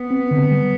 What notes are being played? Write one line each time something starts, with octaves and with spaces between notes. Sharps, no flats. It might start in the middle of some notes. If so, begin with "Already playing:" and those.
Already playing: B3
C4
D3
G3